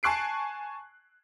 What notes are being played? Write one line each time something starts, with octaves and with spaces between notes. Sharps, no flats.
G#5 A5 C#6 F#6 C7 D7